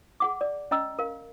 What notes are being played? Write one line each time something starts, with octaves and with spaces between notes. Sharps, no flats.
G#4 F#5 D6
D5
C#4 D#5 A#5 E6
A#4 F5